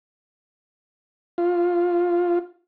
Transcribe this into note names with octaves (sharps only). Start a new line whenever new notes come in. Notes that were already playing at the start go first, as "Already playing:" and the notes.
F4